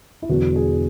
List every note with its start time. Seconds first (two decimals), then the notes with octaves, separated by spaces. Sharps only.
0.22 E4
0.29 E1 E2 D3 F#3 F#4
0.56 G#4